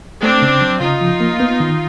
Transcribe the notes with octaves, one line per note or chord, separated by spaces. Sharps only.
A3 C4 D4
C#3
F#3
C#3 D#4 F4
F3
A#3
B3
D#3